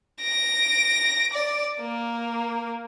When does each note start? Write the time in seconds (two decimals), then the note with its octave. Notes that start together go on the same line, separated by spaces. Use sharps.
0.22 A#6 D7
1.33 D5
1.81 A#3